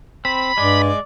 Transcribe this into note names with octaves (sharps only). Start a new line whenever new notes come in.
C4 B5
G2 G#3 D5